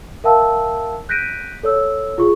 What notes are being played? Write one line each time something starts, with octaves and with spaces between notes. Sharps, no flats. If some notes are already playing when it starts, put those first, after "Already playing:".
A#4 E5 F5 G5 A5 E6
F#6 G6 A#6 B6 D7 D#7
A4 C#5 E6
F4 G#4 C#6